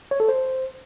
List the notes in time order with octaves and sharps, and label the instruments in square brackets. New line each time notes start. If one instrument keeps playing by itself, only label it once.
[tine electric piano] C#5
A4
C5